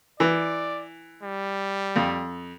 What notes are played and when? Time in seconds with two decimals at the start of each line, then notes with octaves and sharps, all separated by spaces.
0.20 E3 D5
1.23 G3
1.96 F2